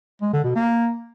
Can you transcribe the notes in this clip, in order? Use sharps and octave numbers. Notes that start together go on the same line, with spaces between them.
G#3
D3
B2
A#3